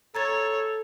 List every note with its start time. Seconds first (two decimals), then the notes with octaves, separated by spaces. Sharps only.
0.15 A4 C#5 A#5 G#6 A6